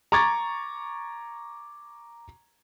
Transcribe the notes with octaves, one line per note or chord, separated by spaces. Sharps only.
A#5 C#6 D6 G#6 A6